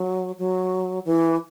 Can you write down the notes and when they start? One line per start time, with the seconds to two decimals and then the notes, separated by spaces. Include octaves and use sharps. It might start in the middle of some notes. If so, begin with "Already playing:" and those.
Already playing: F#3
0.39 F#3
1.05 E3